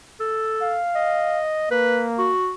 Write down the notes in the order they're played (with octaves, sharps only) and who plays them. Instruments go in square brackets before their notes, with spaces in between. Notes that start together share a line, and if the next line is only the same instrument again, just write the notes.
[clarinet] A4
[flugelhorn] F5
[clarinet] D#5
[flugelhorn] A#3 [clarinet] B4
[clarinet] F#4